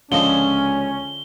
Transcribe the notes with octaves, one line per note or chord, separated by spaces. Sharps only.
C#2 D3 F3 C#4 D#5 G7